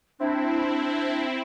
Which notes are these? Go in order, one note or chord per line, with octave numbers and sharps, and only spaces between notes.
C4 D4 E4